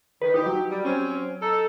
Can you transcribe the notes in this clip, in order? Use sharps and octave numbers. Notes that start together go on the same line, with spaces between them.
D#3 B4
D#4 G4
F#3
G3
C4 C#4
D#4 A4